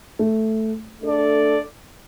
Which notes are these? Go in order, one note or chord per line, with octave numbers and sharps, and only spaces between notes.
A3
A3 D4 A4 D5